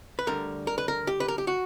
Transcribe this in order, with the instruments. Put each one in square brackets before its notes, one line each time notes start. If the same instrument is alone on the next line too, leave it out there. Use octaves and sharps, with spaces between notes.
[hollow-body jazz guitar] B4
D2 D3 G3 A#4
A#4
B4
A#4
G4
B4
A#4
G4
F#4